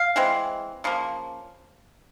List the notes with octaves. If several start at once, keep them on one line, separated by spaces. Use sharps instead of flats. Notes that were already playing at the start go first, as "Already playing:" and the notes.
Already playing: F5
E3 G#3 C4
C#3 F3 A#3